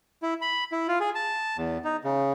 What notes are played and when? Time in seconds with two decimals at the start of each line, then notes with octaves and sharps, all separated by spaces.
0.22 E4
0.41 B5
0.72 E4
0.88 F4
1.00 G#4
1.15 A5
1.57 E2
1.84 D#4
2.04 C#3